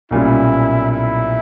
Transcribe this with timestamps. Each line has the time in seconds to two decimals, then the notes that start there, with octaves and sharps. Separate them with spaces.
0.11 B1 A#2 G3 C#4 E4
0.91 E4